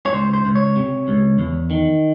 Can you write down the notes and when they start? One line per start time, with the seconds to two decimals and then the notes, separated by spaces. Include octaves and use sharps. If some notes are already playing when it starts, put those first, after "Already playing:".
0.06 C#5
0.13 C#2 C5
0.33 C5
0.45 C#2
0.55 C#5
0.76 C3
1.08 C#2
1.39 E2
1.71 D#3